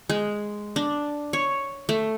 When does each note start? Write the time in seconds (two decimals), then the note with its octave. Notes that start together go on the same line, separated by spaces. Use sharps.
0.09 G#3
0.76 D4
1.33 C#5
1.89 A3